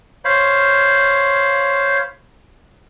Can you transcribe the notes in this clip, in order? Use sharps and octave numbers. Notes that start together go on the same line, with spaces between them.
C5 C#5 F5 B5